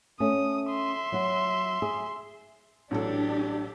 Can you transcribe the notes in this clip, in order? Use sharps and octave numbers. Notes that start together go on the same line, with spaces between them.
A3 C#4 D#6
E5 C6
F#3 F#4
G#4
A1 F#3 D4 G4 A4